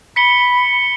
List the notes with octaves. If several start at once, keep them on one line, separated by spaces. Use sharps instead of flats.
B5 B6 C#7 G7